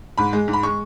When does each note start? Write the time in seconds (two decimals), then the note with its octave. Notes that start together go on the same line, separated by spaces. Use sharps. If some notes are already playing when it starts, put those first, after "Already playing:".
0.18 G#2 B5
0.33 G#3
0.48 G#2
0.53 B5
0.63 G#3 C#6